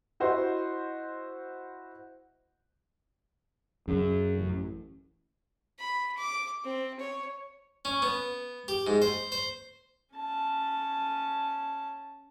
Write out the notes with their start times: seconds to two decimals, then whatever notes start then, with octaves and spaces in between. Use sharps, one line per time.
0.20 E4 F#4 C5 D#5
3.88 F#2 C#3
4.37 A1
5.79 B5
6.17 D6
6.64 C4
6.99 C#5
7.85 C#4
8.02 B3
8.68 G4
8.87 G#2
9.02 C5
9.32 C5
10.14 C#4 A5